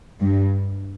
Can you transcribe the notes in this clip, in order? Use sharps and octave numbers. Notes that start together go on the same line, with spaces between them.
G2